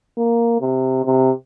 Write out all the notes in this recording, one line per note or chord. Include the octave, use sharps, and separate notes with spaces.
A#3
C3
C3